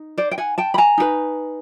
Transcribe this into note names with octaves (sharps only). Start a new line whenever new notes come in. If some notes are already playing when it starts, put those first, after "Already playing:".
Already playing: D#4
C5 D5
G5
F#5 G#5
G5 A5
B5
G#5 A#5
D#4 G4 B4